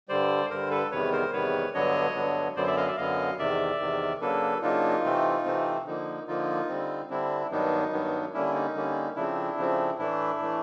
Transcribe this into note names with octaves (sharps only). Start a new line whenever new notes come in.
G2 D3 G3 C5 D5
G2 D3 G3 A#4 C5
A4 B4
E2 C3 D#3 G3 B3 B4 C#5
A#4 C5
E2 C3 D#3 G3 B3 B4 C#5
G2 D3 F#3 B3 D4 C#5 D#5
G2 D3 F#3 B3 D4
F#2 D3 F#3 B3 C5 D5
D5 E5
D#5 F5
D5 E5
F#2 D3 F#3 B3 D#5 F5
E2 C3 D#3 D5 E5
E2 C3 D#3
C#3 F#3 A#3 D4 A4 B4
C#3 F#3 A#3 D4 D#4 F4
C3 E3 A3 C4
C3 E3 A3 C4
D3 F3 A#3 D#4
D3 F3 A#3 D#4 F4
D3 G3 C4
D3 G3 C4 D4 E4
G2 D#3 F#3 B3 D4 D#4
G2 D#3 F#3 B3 D4
D3 G3 A#3 C#4 D4 E4
D#4
D3 G3 A#3 C#4
C#3 F3 A3 C4 D4 E4
C#3 F3 A3 C4
A2 E3 A3 D4 E4
A2 E3 A3